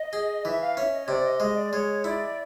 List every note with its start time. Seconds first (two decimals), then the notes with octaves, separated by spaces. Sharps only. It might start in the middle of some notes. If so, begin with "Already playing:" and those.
Already playing: D#5
0.13 G#4
0.45 E3 E5
0.60 F5
0.77 C#4 E5
0.92 D#5
1.03 C#5
1.08 C3 D5
1.24 D#5
1.40 G#3 D#5
1.56 D5
1.72 G#3 C#5
2.04 E4 D5